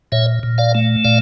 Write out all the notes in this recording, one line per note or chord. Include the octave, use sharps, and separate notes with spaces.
A#2 C#5 E5
A#2
D5 F5
A3
A#2 D5 F5